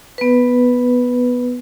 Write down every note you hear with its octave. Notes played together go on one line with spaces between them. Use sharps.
B3 B4